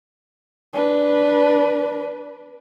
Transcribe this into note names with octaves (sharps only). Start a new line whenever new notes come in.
D4 B4